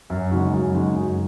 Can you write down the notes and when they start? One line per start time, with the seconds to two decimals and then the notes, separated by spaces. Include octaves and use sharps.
0.10 F#2
0.32 C#3 G#3 D#4 F#4
0.53 F#2
0.74 C#3 G#3 D#4 F#4
0.95 F#2